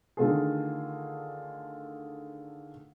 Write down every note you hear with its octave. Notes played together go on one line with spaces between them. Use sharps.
D3 D#3 A3 F4 G#4